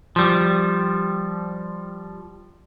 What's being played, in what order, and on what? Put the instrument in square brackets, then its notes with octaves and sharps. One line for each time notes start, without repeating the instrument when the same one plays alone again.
[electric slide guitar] F3 G3